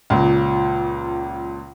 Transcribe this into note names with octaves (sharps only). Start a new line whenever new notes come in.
C#2 A#2